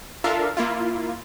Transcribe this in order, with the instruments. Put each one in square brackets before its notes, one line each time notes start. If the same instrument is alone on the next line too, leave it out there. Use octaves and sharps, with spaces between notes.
[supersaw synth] D4 F4 A4 A#4 E5 F5
A#3 E4 F4